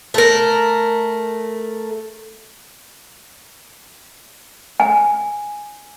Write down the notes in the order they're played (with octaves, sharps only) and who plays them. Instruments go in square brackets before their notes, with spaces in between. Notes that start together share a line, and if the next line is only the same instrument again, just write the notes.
[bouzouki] A3 A#4
[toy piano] G#5